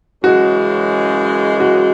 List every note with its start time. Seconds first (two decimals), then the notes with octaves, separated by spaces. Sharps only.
0.23 F#2 C#3 E3 G#3 F#4
1.60 F#4